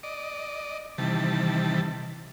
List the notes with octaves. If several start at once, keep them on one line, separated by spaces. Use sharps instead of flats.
D5 D#5
C3 D#3 E3 G3 A5